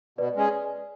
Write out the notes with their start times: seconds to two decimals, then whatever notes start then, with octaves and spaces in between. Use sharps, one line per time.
0.18 B2 B4 D5
0.36 G#3 C#4 G#4